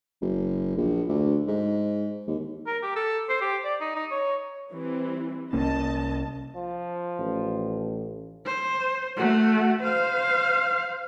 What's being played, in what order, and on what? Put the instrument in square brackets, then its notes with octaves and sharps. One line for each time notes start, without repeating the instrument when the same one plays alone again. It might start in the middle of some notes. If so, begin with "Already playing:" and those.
[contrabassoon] F#1
A#1
D2
G#2
D#2
[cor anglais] A#4
G4
A4
C5
G4
D5
D#4
D#4
C#5
[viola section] E3 G3 C4
[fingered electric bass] C2 A#3 C#4 [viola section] D#5 A5
[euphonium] F3
[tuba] A1
[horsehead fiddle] C5
A3 F#4
C5 F5